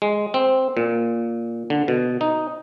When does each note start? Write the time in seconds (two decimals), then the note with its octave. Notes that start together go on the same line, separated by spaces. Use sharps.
0.02 G#3
0.34 C4
0.77 A#2
1.70 D3
1.88 B2
2.21 D#4